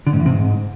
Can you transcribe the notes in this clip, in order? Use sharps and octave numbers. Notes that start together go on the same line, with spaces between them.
D3
G#2
E2
C3
G#2